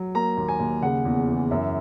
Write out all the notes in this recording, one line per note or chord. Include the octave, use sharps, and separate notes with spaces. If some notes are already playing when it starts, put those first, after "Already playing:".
Already playing: F#3
A#3 A#5
D#2
G#5
D#2
C#3 F#5
E2
E3
F#2 E5